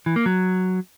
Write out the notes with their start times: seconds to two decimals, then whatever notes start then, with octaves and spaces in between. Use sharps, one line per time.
0.06 E3
0.16 A#3
0.26 F#3